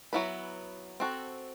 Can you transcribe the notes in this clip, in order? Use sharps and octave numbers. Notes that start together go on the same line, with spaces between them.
F#3 B3 E4 B4
C4 F#4 A4